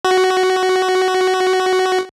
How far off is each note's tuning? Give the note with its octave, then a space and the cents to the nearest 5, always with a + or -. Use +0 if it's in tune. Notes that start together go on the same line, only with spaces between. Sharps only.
F#4 +10